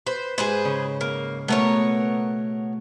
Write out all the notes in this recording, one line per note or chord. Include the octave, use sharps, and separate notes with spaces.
B4 C5
G#2 G#4 B4 C5
C#3
A#3
B2 A3 B3 A#4 C#5